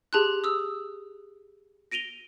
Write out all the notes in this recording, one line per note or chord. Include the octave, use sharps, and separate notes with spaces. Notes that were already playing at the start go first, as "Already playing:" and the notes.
G4 G#4 A5 C6 F#6
D#6 E6
A#6 D7 D#7 F7 G7